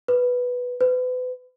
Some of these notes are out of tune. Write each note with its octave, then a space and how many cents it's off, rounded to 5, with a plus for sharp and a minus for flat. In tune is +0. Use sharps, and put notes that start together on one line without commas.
B4 +0
B4 +35